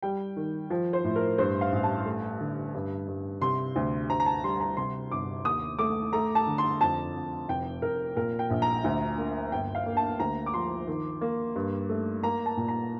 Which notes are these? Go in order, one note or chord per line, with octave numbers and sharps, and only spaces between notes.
G3 G5
D#3
F3
C5
A2
A#4
G2 C5
F5
A1
A5
A3
D3
G2
G2
C3 C6
D2
D2 A#5
A#5
A5
G3 C6
A#5
C3 C6
G1 D6
D#2 D#6
A3 D6
A3 A#5
A5
D3
C6
F2 A5
F2
F1 G5
F1 A#4
A#2 A#4
G5
A#1
A#5
D2
A#3
G1 G5
F5
A#3
A5
D2 A#5
D6
F3 C6
D#3
A#3
G2
A3
A#3 A#5
A5
A#2
A#5